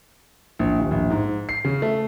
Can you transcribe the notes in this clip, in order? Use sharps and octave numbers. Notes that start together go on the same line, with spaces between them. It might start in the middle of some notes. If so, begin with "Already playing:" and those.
A#1
D#1
A#1
G#2
C7
C#3
A3